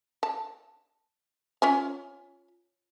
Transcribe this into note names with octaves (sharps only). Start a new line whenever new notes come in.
A5
C#4 F4 G#5